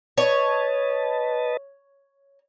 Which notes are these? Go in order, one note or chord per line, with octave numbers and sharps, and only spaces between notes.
B4 C#5 D#5 A5